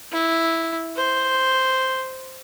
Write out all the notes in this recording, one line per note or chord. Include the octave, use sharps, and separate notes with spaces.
E4
C5